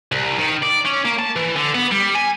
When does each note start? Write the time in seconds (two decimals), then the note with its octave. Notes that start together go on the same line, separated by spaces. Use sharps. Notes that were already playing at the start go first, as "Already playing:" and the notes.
0.12 C2
0.39 D#3
0.63 D5
0.86 C#4
1.05 A#3
1.19 A5
1.36 E3
1.56 D3
1.75 B3
1.92 G3
2.15 G#5